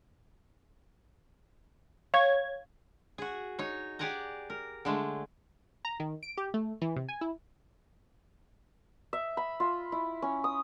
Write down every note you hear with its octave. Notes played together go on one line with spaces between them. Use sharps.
C#5 F5 G#6
F#4 G#4
D#4 C#5
G4 G#4 D5 F#5 G#5 A#5
A#4
D3 G#3 A3
A#5
D#3
D7
G4
A3
E3
C3
G#5
E4
E5
B5
F4
E4
C#4
D#6